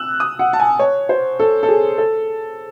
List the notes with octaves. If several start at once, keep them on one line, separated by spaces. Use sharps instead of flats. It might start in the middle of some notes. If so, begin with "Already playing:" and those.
Already playing: E6 F#6
D#6
F#5
A5
G#5
C#5
C5
A4
A4
G#4
A4